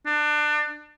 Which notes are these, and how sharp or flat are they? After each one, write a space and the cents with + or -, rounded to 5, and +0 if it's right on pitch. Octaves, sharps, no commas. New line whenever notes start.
D4 +25